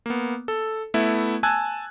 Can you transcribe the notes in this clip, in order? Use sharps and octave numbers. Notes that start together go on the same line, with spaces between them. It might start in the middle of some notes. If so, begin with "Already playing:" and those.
A#3 B3
A4
A3 B3 E4
G#5 A5 E6 F#6 G#6